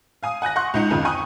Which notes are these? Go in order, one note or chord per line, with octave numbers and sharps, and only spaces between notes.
F5 G#5 D#6
F#5 G#5 F#6 A#6
F#5 C6 C#6 F#6
C#2 D#4 C#7
G#1 F2 C#3 F4
G5 G#5 C#6 D#6 F#6